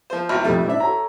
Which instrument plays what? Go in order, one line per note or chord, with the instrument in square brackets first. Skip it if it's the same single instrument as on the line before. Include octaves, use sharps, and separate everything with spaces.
[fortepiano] F3 C5
[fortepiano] G#1 E2 [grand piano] F6
[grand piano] F1 F2 [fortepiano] G3 A3
[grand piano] G#2 D4 [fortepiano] E4 E5
[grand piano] A4 C#5 A#5